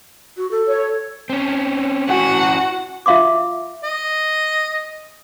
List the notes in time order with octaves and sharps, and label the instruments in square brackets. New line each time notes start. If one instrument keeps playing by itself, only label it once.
[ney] F#4
A4
[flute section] C#5
[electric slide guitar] C4 C#4
[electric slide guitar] C#4 E4 G#5 [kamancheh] F#4 F#5
[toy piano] F4 E5 F5 C6 D6
[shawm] D#5